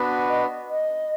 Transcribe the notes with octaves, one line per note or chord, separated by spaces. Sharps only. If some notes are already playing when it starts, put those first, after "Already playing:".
Already playing: B3 D4 F#4 B4
D#5
D#5